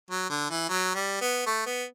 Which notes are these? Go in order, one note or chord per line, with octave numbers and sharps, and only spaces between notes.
F#3
D3
E3
F#3
G3
B3
A3
B3